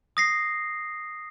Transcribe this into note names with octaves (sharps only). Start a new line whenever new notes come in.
D#6 A#6 C7